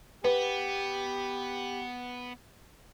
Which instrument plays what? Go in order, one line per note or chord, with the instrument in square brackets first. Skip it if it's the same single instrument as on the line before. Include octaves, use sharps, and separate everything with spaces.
[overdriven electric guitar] B3 [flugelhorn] G4 [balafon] B4